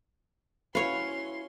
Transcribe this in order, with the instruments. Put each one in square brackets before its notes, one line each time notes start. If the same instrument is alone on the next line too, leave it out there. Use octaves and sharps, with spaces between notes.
[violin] C#4 C6 [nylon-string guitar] E4 F#4 B4 [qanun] C#5 F5